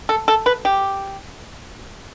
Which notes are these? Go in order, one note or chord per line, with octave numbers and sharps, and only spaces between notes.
A4
A4
B4
G4